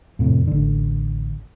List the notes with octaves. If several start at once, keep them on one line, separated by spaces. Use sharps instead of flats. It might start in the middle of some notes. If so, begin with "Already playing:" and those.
F2 A2 C3
A1 D3